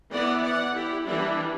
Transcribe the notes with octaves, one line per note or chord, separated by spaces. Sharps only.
E3 B3 E4 D5 F#5
D5 F#5
E4 G4
E3 G3 D4 E4